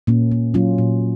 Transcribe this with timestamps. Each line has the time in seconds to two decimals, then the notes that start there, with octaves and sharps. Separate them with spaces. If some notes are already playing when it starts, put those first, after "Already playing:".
0.07 A#2 A#3 C#4
0.32 A#3
0.54 F#3 C#4 F4
0.78 A#2